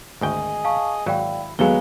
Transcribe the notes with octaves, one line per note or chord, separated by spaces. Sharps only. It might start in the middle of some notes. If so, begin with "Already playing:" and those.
G#1 D2 G#4 D#5 G5
F5 A5 C#6
G#1 F#3 E4 D5 F5 G5
D#2 F#3 G#3 B3 A4 F5 G7